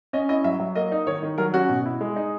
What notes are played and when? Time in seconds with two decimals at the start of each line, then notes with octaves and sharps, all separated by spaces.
0.13 C#4 D#5
0.29 E4 D#5
0.44 F#3 E5
0.60 F#3
0.75 A#3 D#5
0.92 D#4
1.07 D#3 C#5
1.23 D#3
1.38 F#3 A#4
1.53 C#4 F#4
1.69 B2
1.86 E4
2.01 G#3
2.16 D#4